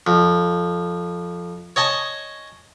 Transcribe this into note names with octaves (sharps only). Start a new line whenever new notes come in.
F2
C#5 D#5 G#5 A5